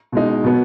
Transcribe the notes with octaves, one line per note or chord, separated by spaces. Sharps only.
B2 G#3 D#4
B2 F#3 B3